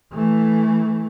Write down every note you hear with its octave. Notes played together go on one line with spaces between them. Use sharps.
E3 A3